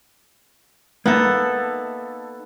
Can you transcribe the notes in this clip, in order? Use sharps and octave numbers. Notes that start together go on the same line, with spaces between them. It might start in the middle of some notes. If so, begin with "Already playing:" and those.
A#3 B3 D#4 A4 E5